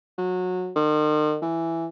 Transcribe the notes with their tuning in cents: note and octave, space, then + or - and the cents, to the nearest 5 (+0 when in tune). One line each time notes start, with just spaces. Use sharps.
F#3 -20
D#3 -40
E3 +5